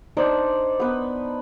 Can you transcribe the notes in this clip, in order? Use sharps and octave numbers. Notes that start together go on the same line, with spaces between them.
D4 D#4 C5 D5
B3 B4